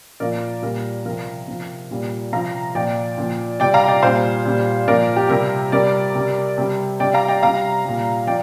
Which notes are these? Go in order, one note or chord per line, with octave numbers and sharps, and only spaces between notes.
A#2 F3 A#4 D5
A#2 G3 A#4
C3 F3 A#4
C3 F3
A#2 G3
C3 F3 F5 A#5
A#2 F3 D5 G5
A#2 F3
C3 G3 D5 G5
F5 A#5
A#5
D5 G5
A#2 G3 C5 F5
A#2 G3
A#2 F3 A#4 D5
G4
C3 G3 A#4
C3 G3 A#4 D5
C3 G3
C3 G3
C3 G3 D5 G5
F5 A#5
D5 G5
C3 G3 F5 A#5
A#2 G3
F3 D5 G5